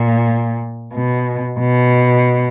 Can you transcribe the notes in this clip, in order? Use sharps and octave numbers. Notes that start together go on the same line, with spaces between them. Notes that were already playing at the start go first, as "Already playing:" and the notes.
Already playing: A#2
B2
B2